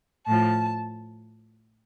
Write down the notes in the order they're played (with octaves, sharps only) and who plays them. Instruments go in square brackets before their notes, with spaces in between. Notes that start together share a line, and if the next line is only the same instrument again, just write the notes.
[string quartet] A2 F3 A5